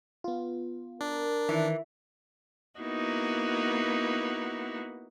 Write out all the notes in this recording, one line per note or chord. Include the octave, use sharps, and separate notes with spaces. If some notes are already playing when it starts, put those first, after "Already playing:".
B3 F4
D4 A#4
D#3 E3
A#3 B3 D#4 E4 F#4